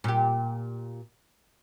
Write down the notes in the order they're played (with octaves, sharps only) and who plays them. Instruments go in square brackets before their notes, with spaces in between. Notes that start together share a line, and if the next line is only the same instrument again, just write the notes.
[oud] A#2 G4